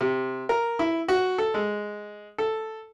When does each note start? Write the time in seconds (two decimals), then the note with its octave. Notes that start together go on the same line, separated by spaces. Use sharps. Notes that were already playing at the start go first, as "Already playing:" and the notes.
0.01 C3
0.49 A#4
0.79 E4
1.08 F#4
1.38 A4
1.54 G#3
2.38 A4